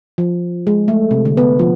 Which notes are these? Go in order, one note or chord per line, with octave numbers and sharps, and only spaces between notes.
F3
G#3
A3
C3
D3
B3
F3